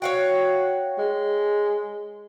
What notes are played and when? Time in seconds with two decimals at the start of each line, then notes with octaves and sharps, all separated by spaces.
0.02 F#4 C#5 F5 G5
0.98 G#3